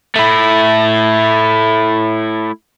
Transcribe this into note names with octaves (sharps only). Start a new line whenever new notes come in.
A3 E4